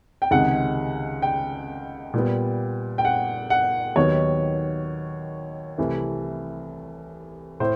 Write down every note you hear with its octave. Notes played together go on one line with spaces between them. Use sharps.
G5
C#2 C3 D#3 G#3 F#5
G5
A#2 G3 B3
G5
F#5
F#5
D#2 D#3 F#3 B3 C#5
C2 C3 E3 A3
A2 C5